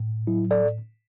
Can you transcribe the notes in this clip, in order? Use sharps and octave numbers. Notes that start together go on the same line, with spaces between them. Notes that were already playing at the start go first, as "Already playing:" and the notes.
Already playing: A2
F#3 E4
A4 D5